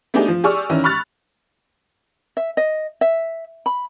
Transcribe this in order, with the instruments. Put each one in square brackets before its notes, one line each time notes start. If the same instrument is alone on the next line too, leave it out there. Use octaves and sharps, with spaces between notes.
[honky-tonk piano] A3 B3 D4 D#4 G4 G#4
F3
G4 G#4 D5 C#6 E6 F6
D#3 E3 C#4
B5 C#6 F6 F#6 A6
[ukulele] E5
D#5
E5
B5